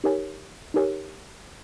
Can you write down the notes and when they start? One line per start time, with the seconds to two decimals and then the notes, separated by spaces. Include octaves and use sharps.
0.04 D#4 G4 A#4 C#5 G#5
0.74 D#4 G4 A#4 C#5 G#5